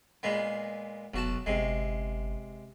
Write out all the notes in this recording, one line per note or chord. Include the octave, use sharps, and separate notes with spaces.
A#2 G#3 B3
F1 B1 F#4 A5
G1 C3 G#3